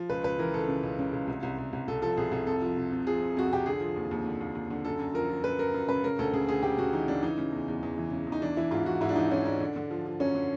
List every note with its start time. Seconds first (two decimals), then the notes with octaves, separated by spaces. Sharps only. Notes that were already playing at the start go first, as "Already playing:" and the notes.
Already playing: F3
0.09 C#2 B4
0.24 C#2 B4
0.39 E3 A#4
0.54 C#2 A4
0.68 C#3
0.83 C#2
0.99 C#3
1.13 C#2
1.28 C2
1.43 C2
1.58 C2
1.73 C2
1.88 C2 A4
2.02 F3 A4
2.17 C2 G#4
2.32 C2 A4
2.47 F2 A4
2.62 F3
2.76 C3
2.92 C3
3.07 F3 G#4
3.21 F2
3.37 F2 F#4
3.51 C3 G4
3.66 D3 G#4
3.80 F3
3.96 D#2
4.11 D#2
4.25 D3
4.40 D#2
4.55 D#2
4.70 D3
4.85 F#2 A4
4.99 F#2
5.14 F3 A#4
5.29 F3
5.44 F#2 B4
5.59 F#2 A#4
5.74 F#2
5.88 C#3 B4
6.04 C#3 A#4
6.19 D2 A4
6.33 C#3 G#4
6.49 D2 G#4
6.63 C#3 G4
6.78 C#3 F#4
6.93 E3 D#4
7.08 C#3 D4
7.23 E3 D#4
7.38 C#3
7.52 E2
7.68 E2
7.83 E2
7.98 E3
8.12 C#3
8.27 E2
8.32 D#4
8.42 E3 D4
8.57 E3 E4
8.71 G#2 F4
8.86 E3 F#4
9.01 G#2 E4
9.09 D4
9.15 E3 D#4
9.30 E3 C#4
9.45 G#2 D4
9.60 D3
9.76 D3
9.91 F3
10.06 F3
10.20 F#2 C#4
10.35 D3